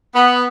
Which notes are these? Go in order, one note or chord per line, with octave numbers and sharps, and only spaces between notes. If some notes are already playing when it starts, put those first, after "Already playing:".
B3